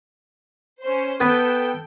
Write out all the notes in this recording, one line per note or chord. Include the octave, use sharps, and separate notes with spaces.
C#4 C5
B3 A4 B4 G5